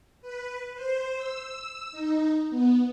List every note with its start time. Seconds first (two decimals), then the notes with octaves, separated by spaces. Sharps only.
0.22 B4
0.74 C5
1.18 E6
1.92 D#4
2.50 B3